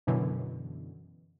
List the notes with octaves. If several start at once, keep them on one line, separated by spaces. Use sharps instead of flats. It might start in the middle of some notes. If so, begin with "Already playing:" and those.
F#2 B2 D3 E3